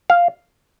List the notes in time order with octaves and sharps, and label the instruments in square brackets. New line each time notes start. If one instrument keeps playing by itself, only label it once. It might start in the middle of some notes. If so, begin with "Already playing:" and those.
[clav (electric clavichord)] F5